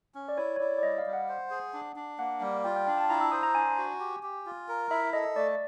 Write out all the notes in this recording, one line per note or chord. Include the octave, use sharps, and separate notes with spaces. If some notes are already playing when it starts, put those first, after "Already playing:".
C#4
D5
E4 C#5
C#5
E4 D5
D5
G3 D#5
F5
G3
F#5
C5
G#4
D4
D4
A#3 F#5
G3 F5
F4 G5
G5
D4 G5
A5
E4 A#5
E6
C5 D#6
A#5
D4 G#5
F#4
G4
G4
F4
A#4
E4 E5
A4 D#5
A3 D5